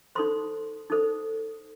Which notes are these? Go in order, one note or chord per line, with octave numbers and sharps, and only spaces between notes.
D#4 A4 C5 C6
D#4 A4 C5